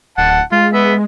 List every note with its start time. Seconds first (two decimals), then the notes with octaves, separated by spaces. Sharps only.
0.18 D1 F#5 A5
0.52 G#3 F4
0.73 B3 E5